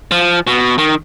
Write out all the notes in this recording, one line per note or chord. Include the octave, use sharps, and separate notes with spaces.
F3
B2
D#3